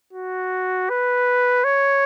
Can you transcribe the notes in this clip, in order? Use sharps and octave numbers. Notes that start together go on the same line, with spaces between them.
F#4
B4
C#5